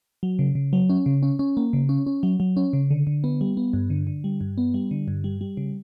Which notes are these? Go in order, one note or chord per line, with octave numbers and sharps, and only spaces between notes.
F#3
C#3
C#3
F#3
C#4
C#3
C#4
C#4
A#3
C#3
C#4
C#4
F#3
F#3
C#4
C#3
D3
D3
B3
G3
B3
G2
D3
D3
G3
G2
B3
G3
D3
G2
G3
G3
C#3